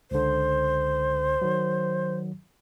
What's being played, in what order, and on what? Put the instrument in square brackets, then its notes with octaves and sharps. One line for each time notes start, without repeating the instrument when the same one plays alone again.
[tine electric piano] C#2 D3 [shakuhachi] C5
[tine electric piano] D#3 F#3